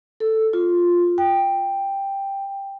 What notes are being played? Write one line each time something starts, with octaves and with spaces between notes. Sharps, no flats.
A4
F4
G5